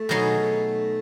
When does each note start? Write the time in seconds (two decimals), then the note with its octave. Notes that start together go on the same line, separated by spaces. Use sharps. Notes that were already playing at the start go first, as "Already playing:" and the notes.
Already playing: A3
0.09 B2 F#3 B3 D#4 G#4